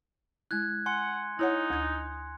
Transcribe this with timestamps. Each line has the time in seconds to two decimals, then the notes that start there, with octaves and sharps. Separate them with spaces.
0.51 G#3 E4 F#6 G#6
0.86 F#5 G#5 C6 C#7
1.39 D#4 E4 C#5 F#5
1.70 D2 G#6